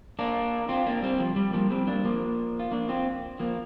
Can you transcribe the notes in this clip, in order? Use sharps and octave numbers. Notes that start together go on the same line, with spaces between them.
A#3 D4
C4 F4
A#3 D4
G3 C4
F3
G3
F3 A#3
G3 C4
A#3 D4
F3 A#3
F4
A#3 D4
C4 F4
F3 A#3